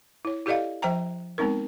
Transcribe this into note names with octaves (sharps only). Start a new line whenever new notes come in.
E4 C#5
E4 G4 A4 D5 D#5 F5
F3 C5 E5 G5 A#5
G#3 B3 C4 D#4 A#4